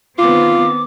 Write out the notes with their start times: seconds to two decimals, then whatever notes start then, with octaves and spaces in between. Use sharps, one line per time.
0.19 D#3 B3 C4 F4 D6